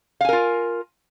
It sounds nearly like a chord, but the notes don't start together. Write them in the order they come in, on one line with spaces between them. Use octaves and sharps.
F5 G#5 A#4 F4